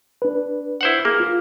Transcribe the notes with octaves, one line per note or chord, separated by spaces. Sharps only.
D4 B4
E4 C5 F#5
A#3 G#4
F4